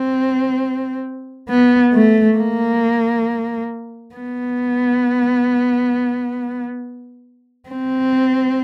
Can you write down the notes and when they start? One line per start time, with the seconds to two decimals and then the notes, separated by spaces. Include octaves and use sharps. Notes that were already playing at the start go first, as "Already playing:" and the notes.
Already playing: C4
1.49 B3
1.94 A3
2.37 A#3
4.15 B3
7.69 C4